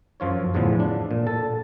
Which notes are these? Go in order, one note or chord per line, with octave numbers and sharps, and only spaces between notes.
F#2 F3 F4 C#5
E2 A2 D3 E3 F3
D4
A#2
A4 A5